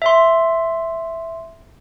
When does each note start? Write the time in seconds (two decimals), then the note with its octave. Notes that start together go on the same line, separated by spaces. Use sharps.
0.02 E5 C6